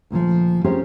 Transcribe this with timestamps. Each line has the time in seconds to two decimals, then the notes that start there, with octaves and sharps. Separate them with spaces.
0.10 D2 A#2 E3 F3
0.64 C4 C#4 G4 G#4 A#4 C5